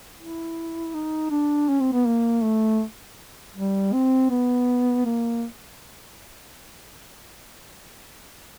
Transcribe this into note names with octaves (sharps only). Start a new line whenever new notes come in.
E4
D#4
D4
C#4
C4
B3
A#3
A3
G3
C4
B3
A#3